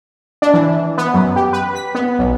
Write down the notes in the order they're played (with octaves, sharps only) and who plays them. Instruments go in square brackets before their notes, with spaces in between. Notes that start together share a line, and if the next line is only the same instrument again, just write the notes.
[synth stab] D4
E3
B3
F#2
G4
B4
B6
B3
B1